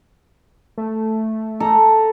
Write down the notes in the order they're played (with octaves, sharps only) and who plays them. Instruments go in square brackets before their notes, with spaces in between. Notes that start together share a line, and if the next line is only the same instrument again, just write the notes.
[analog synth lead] A3
[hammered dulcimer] A4 A#5